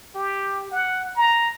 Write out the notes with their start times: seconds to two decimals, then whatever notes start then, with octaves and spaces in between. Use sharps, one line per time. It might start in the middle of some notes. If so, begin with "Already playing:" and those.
0.15 G4
0.71 F#5
1.16 A#5